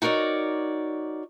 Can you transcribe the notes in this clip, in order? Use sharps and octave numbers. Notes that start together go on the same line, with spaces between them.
D#4 F#4 A#4 C#5 D5